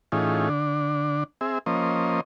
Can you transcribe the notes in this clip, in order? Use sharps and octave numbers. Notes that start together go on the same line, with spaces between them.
A2 E3 C#4 D#4 F4 G#4
D3 D4
C4 G#4 E5
F3 A#3 C#4 C5 D#5